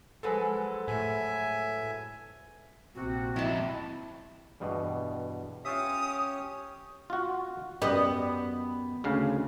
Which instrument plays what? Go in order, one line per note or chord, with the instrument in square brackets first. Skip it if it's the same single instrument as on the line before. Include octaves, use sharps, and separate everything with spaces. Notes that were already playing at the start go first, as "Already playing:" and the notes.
[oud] F3 F#3 G#3 [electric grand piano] A4 B4
[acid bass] A2 [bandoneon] E5 G#5
[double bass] A#1 C3 [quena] F#4
[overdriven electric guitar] F2 G#2 [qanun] E4 A5
[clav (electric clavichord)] E2 G2 B2
[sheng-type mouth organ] C#4 G4 C#5 [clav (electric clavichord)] F4 E5 [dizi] D#6
[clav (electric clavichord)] F4 F#4
[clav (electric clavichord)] F#2 G4 [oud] B3 D#5
[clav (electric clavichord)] D2 C#3 F5